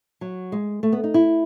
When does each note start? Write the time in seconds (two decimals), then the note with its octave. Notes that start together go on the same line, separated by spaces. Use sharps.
0.21 F#3
0.52 G#3
0.83 A3
0.92 B3
1.04 D#4
1.14 E4